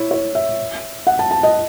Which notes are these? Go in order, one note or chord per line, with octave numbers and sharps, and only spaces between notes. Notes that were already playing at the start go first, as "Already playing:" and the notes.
Already playing: E4 C#5
C#5
E5
F#5
A5
A5
D#5